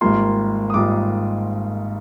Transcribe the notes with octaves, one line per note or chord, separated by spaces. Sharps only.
G#1 G#2 G3 A#3 F4 C6
D#6
G#1 G#2 G3 A#3 F4 D6